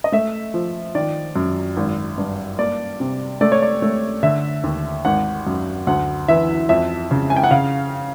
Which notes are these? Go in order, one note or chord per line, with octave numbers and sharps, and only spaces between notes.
D#5
A3 E5
F3
D#3 D5
F#2
G#1
G2
A#3 D5
C3
A3 D5
C#5
D5
A3
D3 E5
D#2
G#1 F#5
F#2
D2 F#5
E3 E5
F2 E5
C#3
G#5
G5
F#5
C#3 F5